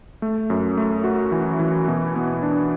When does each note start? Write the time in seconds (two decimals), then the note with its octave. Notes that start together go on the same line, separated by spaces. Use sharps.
0.22 A3
0.50 F#2
0.77 A3
1.04 F#4
1.32 E3
1.59 E3
1.88 B2
2.16 B3
2.42 D4